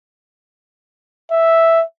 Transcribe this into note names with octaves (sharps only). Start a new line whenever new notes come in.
E5